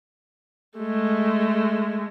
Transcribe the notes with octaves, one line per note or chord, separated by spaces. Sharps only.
G#3 A3